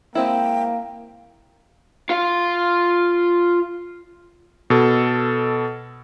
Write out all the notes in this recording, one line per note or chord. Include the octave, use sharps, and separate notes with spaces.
G#3 A#3 C4 E4 G5
F4 F5
B2 A4